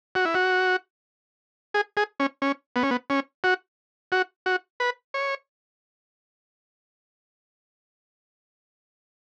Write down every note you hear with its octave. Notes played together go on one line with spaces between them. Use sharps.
F#4
E4
F#4
G#4
G#4
C#4
C#4
B3
C#4
B3
C#4
F#4
F#4
F#4
B4
C#5